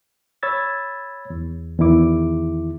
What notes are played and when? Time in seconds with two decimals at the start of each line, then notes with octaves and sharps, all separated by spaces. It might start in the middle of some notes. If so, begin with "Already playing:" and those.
0.43 C#5 B5 E6 G#6 A6
1.30 E2
1.79 E2 D#3 E4 D6